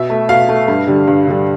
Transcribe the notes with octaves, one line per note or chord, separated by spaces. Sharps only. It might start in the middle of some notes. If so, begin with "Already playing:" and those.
Already playing: B2 E5
A3
B2 F5
A3
G2
D3 G3
G2
D3 G3